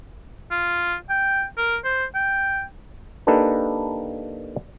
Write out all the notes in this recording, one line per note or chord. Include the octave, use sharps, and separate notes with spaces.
F4
G5
A#4
C5
G5
A#3 D4 D#4 G4 A4 B4